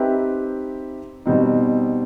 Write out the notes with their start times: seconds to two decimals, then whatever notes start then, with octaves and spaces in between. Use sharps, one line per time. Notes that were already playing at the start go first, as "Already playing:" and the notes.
Already playing: C4 D#4 G4 B4 E5
1.26 B2 G3 C4 D#4